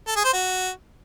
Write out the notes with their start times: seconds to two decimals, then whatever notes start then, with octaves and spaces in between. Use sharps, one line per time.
0.07 A4
0.16 G#4
0.25 C5
0.33 F#4